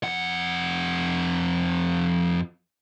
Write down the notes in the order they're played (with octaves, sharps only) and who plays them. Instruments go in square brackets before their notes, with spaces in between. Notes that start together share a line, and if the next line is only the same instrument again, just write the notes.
[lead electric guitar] F2 F#5